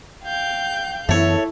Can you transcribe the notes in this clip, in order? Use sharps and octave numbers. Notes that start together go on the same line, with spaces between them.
F5 G5 G6
F#2 E3 A3 B3 E4 A4 C#5